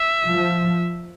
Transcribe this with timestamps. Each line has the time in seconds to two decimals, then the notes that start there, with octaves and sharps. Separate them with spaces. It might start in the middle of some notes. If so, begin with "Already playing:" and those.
Already playing: E5
0.26 F3